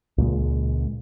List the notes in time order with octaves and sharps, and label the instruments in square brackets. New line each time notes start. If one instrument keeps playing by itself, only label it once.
[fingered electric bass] C#2 A#2 G#3